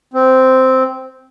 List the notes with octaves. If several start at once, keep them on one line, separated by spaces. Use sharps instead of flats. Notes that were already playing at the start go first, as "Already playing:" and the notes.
C4